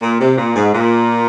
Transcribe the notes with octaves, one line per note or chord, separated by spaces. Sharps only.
A#2
C3
A#2
G#2
A#2